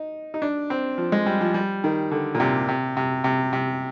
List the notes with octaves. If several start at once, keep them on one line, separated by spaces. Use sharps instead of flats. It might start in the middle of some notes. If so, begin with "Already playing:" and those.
Already playing: D#4
D#4
D4
C4
F3
G#3
G3
F3
G3
D#3
D3
A#2
C3
C3
C3
C3
C3